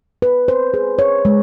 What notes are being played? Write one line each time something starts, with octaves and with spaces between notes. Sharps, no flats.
B4
C5
G#4
C#5
G#3